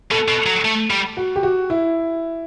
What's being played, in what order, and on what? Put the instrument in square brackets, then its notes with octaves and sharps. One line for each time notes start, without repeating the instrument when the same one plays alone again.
[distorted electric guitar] B2 [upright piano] A4
[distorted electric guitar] B2
F#3
A3
G3
[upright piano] F#4
G4
F#4
E4